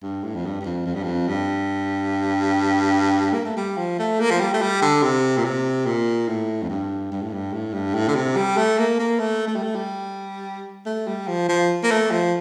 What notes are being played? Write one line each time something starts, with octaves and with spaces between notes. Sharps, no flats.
G2
A2
F2
G2
G2
F2
F2
G2
F2
G2
A#3
A3
G3
F3
A3
A#3
F3
G3
A3
G3
D3
C3
A#2
C3
A#2
A2
F2
G2
G2
A2
G2
A2
G2
A2
D3
C3
G3
A3
A#3
A#3
A3
A3
G3
A3
G3
A3
G3
F3
F3
A#3
A3
F3